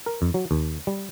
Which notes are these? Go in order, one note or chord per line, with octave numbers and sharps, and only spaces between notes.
A#4
F2
F#3
D#2
G3